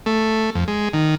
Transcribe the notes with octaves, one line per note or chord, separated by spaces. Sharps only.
A3
F2
G#3
D#3